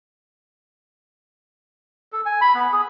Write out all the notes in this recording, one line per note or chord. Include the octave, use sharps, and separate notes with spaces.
A4
G#5
B5
B3
G#4